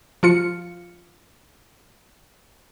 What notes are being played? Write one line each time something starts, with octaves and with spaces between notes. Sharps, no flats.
F3 F4 C#7